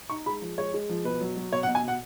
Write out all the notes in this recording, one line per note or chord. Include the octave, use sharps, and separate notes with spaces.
D#4 C#6
G#3 B5
F3
G#3 C#5
G#3
F3
B2 B4
F#3
F#3
B2 C#5
F#5
B2
G#5
B2 F#5